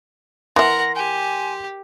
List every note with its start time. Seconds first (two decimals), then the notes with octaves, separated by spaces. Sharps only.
0.56 E3 A#4 E5 F#5 C6 A#6
0.96 G4 G#5